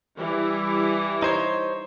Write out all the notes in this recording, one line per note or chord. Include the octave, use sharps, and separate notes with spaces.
E3 G3 E4
D#4 C5 C#5